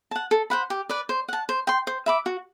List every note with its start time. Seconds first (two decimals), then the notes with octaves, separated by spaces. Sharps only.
0.11 F#5 A5
0.31 A4
0.50 C5 F#5 B5
0.70 G4
0.89 B4 D5
1.09 C5
1.28 F#5 A5
1.49 C5
1.67 G5 C6
1.87 C5
2.06 E5 B5 D6
2.26 F#4